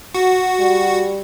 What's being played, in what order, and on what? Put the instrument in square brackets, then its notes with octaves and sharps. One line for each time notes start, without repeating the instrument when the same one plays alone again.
[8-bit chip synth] F#4
[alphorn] G3